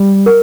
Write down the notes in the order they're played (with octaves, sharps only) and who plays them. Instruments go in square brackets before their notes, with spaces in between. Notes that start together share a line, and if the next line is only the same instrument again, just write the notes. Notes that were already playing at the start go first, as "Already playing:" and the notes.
Already playing: [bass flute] G3
[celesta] A#4